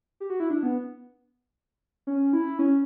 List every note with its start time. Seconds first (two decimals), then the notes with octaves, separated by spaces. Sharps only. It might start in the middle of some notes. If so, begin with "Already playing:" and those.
0.20 G4
0.30 F#4
0.40 E4
0.50 D4
0.63 B3
2.07 C#4
2.33 E4
2.59 C#4